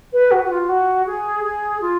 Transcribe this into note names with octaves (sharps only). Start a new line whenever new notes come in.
B4
F#4
F#4
F4
F#4
G#4
G#4
F4